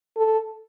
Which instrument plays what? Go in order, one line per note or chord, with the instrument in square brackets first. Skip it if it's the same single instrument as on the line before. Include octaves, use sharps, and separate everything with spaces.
[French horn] A4